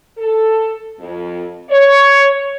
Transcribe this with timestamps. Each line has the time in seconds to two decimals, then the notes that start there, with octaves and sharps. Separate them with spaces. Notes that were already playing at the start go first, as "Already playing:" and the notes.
0.18 A4
0.99 F2
1.70 C#5